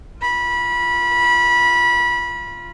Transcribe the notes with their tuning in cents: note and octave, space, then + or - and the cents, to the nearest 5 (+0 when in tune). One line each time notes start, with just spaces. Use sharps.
F4 -15 B5 -25